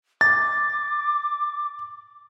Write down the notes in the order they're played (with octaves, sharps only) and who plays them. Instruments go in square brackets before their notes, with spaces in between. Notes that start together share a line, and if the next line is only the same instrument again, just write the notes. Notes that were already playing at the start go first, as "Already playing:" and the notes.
[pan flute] D6 [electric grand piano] A6